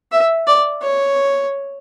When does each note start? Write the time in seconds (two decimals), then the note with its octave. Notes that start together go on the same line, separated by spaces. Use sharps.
0.12 E5
0.47 D5
0.82 C#5